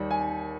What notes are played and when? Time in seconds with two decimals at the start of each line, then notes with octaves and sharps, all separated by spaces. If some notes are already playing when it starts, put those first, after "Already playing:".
Already playing: D#2 D#3 G3
0.11 G#5